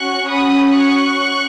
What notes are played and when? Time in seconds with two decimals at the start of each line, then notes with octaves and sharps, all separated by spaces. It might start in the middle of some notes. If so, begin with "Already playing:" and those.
Already playing: C#4 F#4 C#6 F#6
0.29 B5 D#6
0.75 C#6 F#6